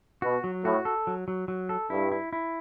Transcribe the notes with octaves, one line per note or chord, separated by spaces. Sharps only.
B2 F#4
F#3
A2 F#4
A4
F#3
F#3
F#3
A4
G2 E4
E4
E4